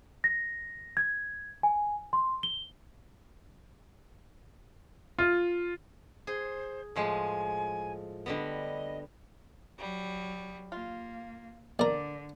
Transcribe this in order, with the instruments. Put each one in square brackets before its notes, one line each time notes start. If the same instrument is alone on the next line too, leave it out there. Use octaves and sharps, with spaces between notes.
[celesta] A#6
G#6
G#5
C6
G7
[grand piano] F4
[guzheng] G#4 [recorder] C5
[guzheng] A2 F3 G#3 [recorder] G#5
[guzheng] D3 G3 B3 [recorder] D#5
[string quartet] F#3 G3
[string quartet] A#3 [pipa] F4
[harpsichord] A#1 A#4 [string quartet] D3 [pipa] D5